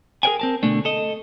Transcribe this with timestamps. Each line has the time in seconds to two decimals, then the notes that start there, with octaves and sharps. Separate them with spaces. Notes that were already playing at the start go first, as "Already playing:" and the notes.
0.23 G#4 A#4 B4 C#5 G5 G#5
0.40 C4 A#4 A5
0.63 B2 D3 A3 D4
0.85 A4 D#5